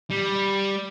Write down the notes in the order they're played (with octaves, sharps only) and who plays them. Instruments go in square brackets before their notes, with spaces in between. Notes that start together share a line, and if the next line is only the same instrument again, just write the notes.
[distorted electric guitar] G3